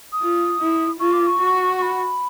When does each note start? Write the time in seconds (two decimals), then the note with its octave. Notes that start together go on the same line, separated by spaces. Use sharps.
0.12 D#6
0.22 F4
0.60 E4
1.00 F4 C#6
1.13 D6
1.27 C#6
1.39 F#4
1.78 C#6
1.82 B5